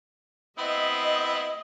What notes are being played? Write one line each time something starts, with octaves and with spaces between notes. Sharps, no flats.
B3 C4 E4 D#5